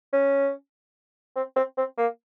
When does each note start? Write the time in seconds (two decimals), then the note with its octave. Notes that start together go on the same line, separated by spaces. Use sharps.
0.13 C#4
1.36 C4
1.56 C4
1.77 C4
1.97 A#3